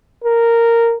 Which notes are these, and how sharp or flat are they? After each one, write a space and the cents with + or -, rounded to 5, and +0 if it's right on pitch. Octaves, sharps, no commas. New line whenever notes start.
A#4 -10